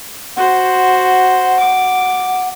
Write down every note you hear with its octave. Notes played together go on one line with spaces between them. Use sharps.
F#4 C5 F#5
D6